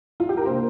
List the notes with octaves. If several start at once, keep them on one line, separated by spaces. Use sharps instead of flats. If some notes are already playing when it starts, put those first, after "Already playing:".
F4
G4
A#4
C3 A#3 D4 C5